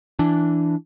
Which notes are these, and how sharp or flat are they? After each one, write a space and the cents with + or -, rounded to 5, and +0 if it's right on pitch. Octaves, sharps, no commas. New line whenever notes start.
E3 +10 D4 +0